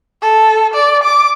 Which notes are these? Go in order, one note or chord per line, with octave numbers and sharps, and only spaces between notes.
A4
D5
D6